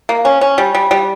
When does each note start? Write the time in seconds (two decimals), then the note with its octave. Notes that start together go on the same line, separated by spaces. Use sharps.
0.09 A#3
0.25 C#4
0.41 C#4
0.58 G3
0.74 G3
0.91 G3